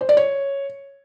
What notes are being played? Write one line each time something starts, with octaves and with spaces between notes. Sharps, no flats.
C5
D5
C#5